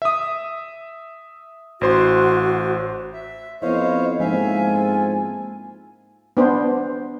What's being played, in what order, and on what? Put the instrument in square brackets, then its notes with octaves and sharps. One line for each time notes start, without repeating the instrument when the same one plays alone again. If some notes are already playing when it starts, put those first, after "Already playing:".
[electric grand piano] E5 D#6
[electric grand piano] A1 C5 C6 [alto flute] F#4
[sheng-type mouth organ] E5
[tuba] F2 [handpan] B3 E4 [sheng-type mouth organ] C5 C#5 F5 [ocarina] D#5
[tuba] G#2 [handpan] F3 A#3 C4 [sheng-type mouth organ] E5 F5 [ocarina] G#5
[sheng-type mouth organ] F4 A4
[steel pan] B3 D4 C5